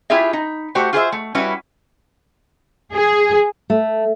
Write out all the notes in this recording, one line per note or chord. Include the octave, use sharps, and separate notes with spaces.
E4 F4 G4 G#4 E5
D#4
A3 F#4 G4 C5
F4 G#4 C5 E5
A3
G3 C#4 E4 F#4 B4
G#4
A3